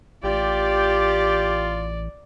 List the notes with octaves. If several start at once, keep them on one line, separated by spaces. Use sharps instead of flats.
A1 F4 G4 D5